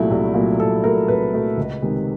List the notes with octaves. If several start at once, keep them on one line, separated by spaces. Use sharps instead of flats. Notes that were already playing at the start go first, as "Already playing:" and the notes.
Already playing: C2 A#2 F#3 A3 E4
C2
A#2 F#3 A3
C2 A4
A#2 F#3 A3 A#4
C2 B4
A#2 F#3 A3
C#2
C3 D#3 G#3